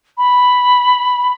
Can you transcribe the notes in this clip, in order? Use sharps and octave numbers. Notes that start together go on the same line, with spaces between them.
B5